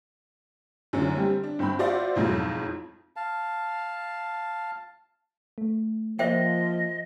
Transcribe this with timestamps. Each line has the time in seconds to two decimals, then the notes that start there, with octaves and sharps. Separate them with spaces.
0.93 F#2 D3 E3 C#4
1.16 G3 C4 G4
1.43 D4
1.59 G1 C4 G5 B5
1.79 F4 F#4 C5 D5 E5 F5
2.16 B1 F2 G#2 E3 F#3
3.16 F5 A5
5.58 A3
6.19 F3 A#3 C5 D#5 E5 G5